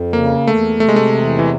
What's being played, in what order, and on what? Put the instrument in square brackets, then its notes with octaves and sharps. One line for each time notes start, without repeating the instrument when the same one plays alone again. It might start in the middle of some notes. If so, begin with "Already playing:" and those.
Already playing: [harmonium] F2
[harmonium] C#3 [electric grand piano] A#3
[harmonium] E2 [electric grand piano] A3
[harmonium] C3 [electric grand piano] A3
[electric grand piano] G#3
A3
[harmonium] E2
[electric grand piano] E3